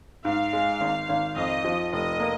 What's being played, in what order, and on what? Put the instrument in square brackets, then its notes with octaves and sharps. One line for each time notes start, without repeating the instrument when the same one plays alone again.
[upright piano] G#2 [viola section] F5
[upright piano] G#3
G#1
G#1
[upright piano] F2 [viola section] D#5
[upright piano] F3
[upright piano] F1 [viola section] D#5
[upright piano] A#3